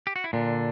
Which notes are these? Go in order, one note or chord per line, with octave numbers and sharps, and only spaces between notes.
G4
F#4
E4
A#2 D3 D4